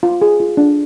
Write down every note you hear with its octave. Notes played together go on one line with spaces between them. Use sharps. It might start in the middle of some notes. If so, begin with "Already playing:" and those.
F4
G#4
F4
D4